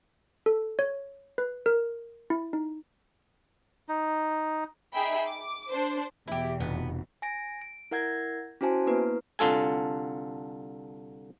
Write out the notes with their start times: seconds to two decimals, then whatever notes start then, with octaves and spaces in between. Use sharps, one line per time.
0.46 A4
0.79 C#5
1.38 B4
1.66 A#4
2.30 E4
2.53 D#4
3.89 D#4
4.93 D#4 G#4 E5 G5 B5
5.28 D6
5.71 D4 C5
6.28 E2 B2 E4 G4
6.60 F1 B3
7.22 G#5 A#6 D7
7.62 D7
7.91 E4 A#4 F#5 G6 G#6 A#6
8.61 C#4 E4 F#4 C5 G#5 A5
8.87 A#3 B3 E4 B4
9.39 C2 D3 F4 A4 G#5